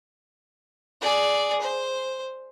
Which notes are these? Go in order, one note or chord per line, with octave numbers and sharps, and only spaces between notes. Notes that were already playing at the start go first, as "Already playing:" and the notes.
G#4 D5
C5